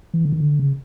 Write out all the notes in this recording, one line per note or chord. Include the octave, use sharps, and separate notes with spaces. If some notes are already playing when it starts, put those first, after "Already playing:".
E3
D3
D#3
D3
C#3